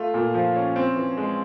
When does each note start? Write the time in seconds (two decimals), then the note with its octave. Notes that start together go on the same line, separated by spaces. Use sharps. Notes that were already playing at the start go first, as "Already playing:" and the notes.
Already playing: A3 F4
0.14 A#2
0.34 F3
0.56 C#4
0.76 C4
0.96 E3
1.18 G#3